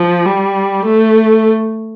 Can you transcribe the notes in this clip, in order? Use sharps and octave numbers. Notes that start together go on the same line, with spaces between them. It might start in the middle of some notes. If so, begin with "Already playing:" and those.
Already playing: F3
G3
A3